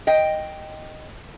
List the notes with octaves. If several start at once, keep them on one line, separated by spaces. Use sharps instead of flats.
D#5 G5